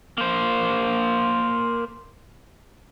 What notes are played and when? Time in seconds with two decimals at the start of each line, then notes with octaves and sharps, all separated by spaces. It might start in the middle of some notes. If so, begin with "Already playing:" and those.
0.18 A#3 C5